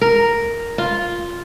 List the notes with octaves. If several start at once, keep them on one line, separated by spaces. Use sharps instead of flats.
A#4
F4